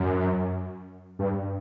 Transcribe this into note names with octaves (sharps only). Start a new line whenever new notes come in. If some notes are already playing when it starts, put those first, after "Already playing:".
Already playing: F#2
G2